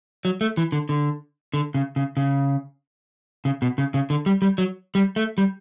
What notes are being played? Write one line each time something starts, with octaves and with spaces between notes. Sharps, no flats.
F#3
A3
E3
D3
D3
D3
C#3
C#3
C#3
C#3
B2
C#3
C#3
D3
G3
G3
F#3
G3
A3
G3